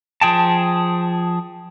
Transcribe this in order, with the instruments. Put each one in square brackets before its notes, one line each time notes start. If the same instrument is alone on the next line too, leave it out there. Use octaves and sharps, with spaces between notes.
[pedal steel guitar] F3 G#4 G5 A5